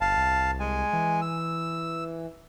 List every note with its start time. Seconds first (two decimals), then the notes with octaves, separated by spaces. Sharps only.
0.01 G1 F5 A5
0.17 C2
0.60 G#3 G#5
0.93 E3
1.21 E6